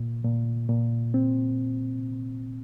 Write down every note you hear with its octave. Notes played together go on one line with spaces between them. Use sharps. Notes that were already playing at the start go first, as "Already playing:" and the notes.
Already playing: A#2
A#2
A#2
C4